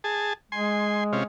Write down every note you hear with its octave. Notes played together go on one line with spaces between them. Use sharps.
G#4 A5
G#3 G#5 C6
C3 C#4 F4